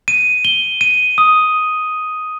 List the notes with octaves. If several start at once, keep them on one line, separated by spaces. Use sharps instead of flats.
D#7
G7
D#7
D#6